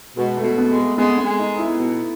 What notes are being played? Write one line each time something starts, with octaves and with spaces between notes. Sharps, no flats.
B2 G#3
A3
B2
B3
G#3
A3
G#3 B3
B3
G#3
D#4
B3
E4
B2